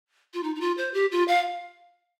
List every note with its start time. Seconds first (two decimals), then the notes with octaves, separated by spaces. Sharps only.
0.34 F4
0.43 D#4
0.55 D#4
0.60 F4
0.77 C5
0.94 G4
1.11 F4
1.28 F5